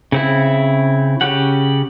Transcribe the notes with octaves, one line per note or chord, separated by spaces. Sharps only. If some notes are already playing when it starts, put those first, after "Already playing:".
C#3 C4 E4
C#3 C#4 G4 F#5